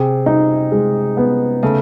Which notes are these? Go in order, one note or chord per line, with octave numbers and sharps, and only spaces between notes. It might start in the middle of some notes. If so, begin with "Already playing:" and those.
Already playing: C3 G#4
D#4
G#3
B3
C#3 A3